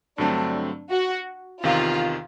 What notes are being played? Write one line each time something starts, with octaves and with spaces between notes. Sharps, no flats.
G2 D3 F#3 A3 C4 D4
F#4
E2 C3 D#3 F4